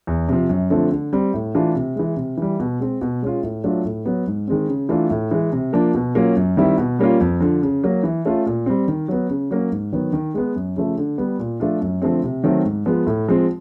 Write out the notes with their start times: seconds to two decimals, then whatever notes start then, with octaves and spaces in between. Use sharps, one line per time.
0.07 E2
0.28 C3 F3
0.49 F#2
0.70 D3 F3 A3 C4
0.91 D3
1.13 G3 C4
1.34 A2
1.55 E3 A3 D4 F4
1.75 C3
1.96 E3 G#3
2.17 C3
2.37 E3 G3
2.60 B2
2.80 G#3 C4
3.01 B2
3.22 G#3 C#4 F4
3.43 A2
3.64 F#3 A3 D4 F4
3.85 A2
4.06 F#3 B3
4.27 G#2
4.48 D#3 G#3 C4
4.69 C#3
4.89 E3 A3 D4 F4
5.10 A2
5.31 E3 G#3
5.53 C3
5.73 F3 A#3 D4
5.94 B2
6.15 F#3 A#3 C#4 F4
6.37 F#2
6.57 D#3 G3 C4 E4
6.78 B2
6.99 G3 A#3 C#4 F4
7.21 F2
7.40 D3 F3
7.63 C#3
7.84 F#3 A#3
8.03 E3
8.26 A3 C#4 F4
8.46 A#2
8.66 G3 C4
8.88 D#3
9.08 F#3 B3
9.30 C#3
9.51 F#3 A#3 C#4
9.72 G#2
9.92 D#3 F#3 B3
10.13 D#3
10.34 G#3 B3
10.56 F#2
10.76 C#3 F3 A3
10.98 D3
11.18 G3 B3
11.39 A#2
11.60 F3 A3 D4 F4
11.81 F#2
12.02 D3 F3 A3 C4
12.24 C3
12.44 D#3 F#3 A3 C4
12.65 G#2
12.86 F3 G#3 B3
13.07 A2
13.28 F3 G#3 C4